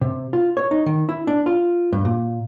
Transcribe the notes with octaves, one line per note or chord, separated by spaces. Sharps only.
C3
F4
C#5
D#4
D#3
E4
D4
F4
G2
A#2